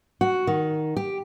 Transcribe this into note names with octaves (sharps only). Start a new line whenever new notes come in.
F#4
D#3
G4